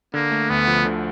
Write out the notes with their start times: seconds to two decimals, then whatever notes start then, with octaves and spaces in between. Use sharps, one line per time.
0.14 D3 A#3
0.31 A3
0.50 D2 B3
0.67 F3
0.85 D3